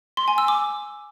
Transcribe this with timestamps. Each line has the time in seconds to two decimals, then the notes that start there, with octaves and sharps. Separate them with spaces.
0.17 C6
0.28 G#5
0.38 E6
0.48 D6